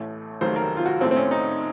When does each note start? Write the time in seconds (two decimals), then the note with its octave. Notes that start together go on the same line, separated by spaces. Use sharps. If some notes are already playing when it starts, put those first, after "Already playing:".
Already playing: A1 A2 A3
0.41 F1 D#2 D#3 F#3 A3 C5
0.56 A#4
0.77 F4
0.86 F#4
1.01 A#1 A2 A3 C4
1.11 C4
1.16 C#4
1.31 D#4